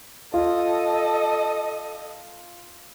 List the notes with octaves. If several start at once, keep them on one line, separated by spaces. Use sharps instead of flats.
F4 A4 D#5